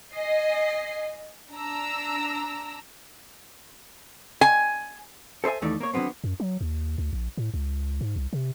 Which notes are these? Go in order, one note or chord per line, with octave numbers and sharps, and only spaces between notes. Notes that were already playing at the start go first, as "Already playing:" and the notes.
D#5 G#5 C7
D4 A#5 E6
G#5
A4 C5 D#5 E5 G#5
D#2 E3 A3 D#4 D5
A#3 C#5
D3 D#3 F#3 B3 C4
F#2
F#3
D#2
D2
A#1
A2
C#2
G#2
C2
C3